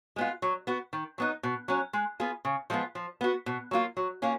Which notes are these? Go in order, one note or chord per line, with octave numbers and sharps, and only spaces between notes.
G#3 B3 F4
F#3
B3 F#4
D#3
F#3 B3 D#4
B2
F#3 C#4
G#3
B3 F4 G#4
C#3
F3 G#3 B3 F4
F3
B3 F#4
B2
F#3 A#3 F4
F#3
A#3 C#4 F4